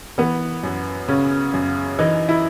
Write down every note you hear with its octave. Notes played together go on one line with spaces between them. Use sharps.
E3 B3
F#2
C#3 C#4
F#2
E3 D#4
E4